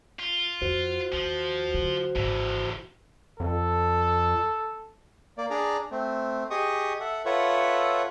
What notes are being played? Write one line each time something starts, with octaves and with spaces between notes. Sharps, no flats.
F4
F2 F#4 C5
D#2 F3
D3 F#3
G#1 E2 A2
F2 A4
A#3 D5
D4 G#4 D5 A#5
A3 C4
G4 G#4 D#5 C#6 D#6
A4 E5 F#5
F4 A4 B4 C#5 E5 F#5